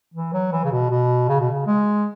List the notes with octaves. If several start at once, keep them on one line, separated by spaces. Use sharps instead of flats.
E3
F#3
E3
C#3
B2
B2
C#3
B2
C#3
G#3